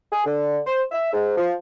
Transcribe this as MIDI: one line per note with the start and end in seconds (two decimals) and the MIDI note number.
0.12 0.24 68
0.26 0.58 50
0.67 0.82 72
0.92 1.08 76
1.13 1.35 44
1.37 1.53 53